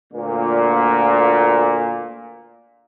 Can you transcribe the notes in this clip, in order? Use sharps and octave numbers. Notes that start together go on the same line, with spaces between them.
D2 A#2